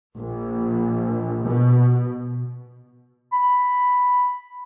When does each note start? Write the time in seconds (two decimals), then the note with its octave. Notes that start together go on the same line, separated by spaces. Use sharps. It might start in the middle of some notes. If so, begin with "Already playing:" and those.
0.18 A#1
1.46 B2
3.33 B5